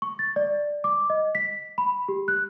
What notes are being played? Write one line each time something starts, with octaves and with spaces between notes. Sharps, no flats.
C#6
A6
D5
D6
D#5
B6
B5
G4
F#6